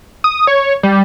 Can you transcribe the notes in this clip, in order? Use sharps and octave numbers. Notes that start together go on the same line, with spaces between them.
D#6
C#5
G3